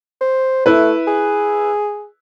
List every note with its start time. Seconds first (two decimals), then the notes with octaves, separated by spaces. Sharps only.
0.21 C5
0.66 A3 E4 B4
1.07 G#4